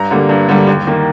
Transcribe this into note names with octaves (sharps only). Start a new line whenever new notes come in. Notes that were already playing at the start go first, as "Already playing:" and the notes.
Already playing: G2 A#5
D3 G3 A#3
G2
D3 G3 A#3
D#2
D#3 A#3